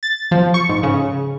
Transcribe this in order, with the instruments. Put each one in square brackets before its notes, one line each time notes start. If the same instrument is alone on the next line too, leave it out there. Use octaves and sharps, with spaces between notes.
[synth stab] A6
F3
C#6
G#2
C#3